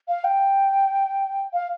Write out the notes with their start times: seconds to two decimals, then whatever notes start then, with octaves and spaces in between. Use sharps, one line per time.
0.08 F5
0.24 G5
1.53 F5